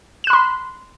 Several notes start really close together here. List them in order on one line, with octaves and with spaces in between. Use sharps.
E7 F#6 B5 C6